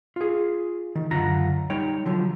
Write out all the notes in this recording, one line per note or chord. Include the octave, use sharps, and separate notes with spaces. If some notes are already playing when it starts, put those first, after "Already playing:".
F4 G#4
D#3
C#2 F#2 D3 F4 A#5
G3 D#4 C#5 G5
D3 F3 F#3